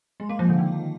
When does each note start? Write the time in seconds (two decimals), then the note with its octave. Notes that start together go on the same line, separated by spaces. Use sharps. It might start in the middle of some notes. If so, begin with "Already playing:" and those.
0.20 G#3
0.29 A#3
0.39 F3
0.49 D3
0.59 D#3